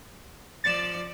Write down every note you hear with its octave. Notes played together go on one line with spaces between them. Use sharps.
F3 D5 A6 E7